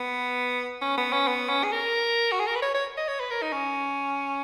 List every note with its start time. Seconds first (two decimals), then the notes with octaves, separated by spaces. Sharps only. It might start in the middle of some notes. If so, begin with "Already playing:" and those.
Already playing: B3
0.82 C#4
0.97 B3
1.13 C#4
1.28 B3
1.49 C#4
1.64 G#4
1.72 A#4
2.32 F#4
2.40 G#4
2.47 A#4
2.55 B4
2.62 C#5
2.74 C#5
2.97 D#5
3.08 C#5
3.20 B4
3.30 A#4
3.42 D#4
3.53 C#4